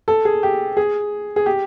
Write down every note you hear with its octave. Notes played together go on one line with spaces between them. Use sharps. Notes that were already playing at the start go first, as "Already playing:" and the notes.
A4
G#4
G4
G#4
G#4
G4